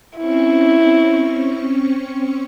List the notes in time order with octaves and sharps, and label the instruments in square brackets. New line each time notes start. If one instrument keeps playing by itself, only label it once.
[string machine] C4 C#4 C#6 [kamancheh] E4